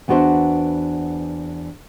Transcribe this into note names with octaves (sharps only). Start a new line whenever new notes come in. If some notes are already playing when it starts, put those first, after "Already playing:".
E2 B3 D4 F#4 C5 E5